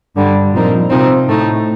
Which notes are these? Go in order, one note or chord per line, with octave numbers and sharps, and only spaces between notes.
G2 D3 G3 D4
A#2 F3 C4 D#4 A#4
C3 F3 C4 D#4
A2 A3 D#4